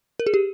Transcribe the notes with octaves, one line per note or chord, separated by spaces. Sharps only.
A#4
G#4
G4